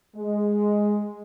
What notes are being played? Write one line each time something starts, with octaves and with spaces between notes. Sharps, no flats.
G#3